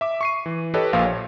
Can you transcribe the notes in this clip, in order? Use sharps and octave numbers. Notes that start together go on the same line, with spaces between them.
E5 D6
C#6 C7 D#7
E3
G4 A4 B4 C#5 D#5
A#1 A#2 F3 F5
C#5